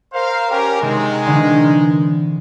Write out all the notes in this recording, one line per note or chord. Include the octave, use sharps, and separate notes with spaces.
A#4 C5 F5
C#4 G4 A#4
C3 D#3 G#3 C4
D3 E3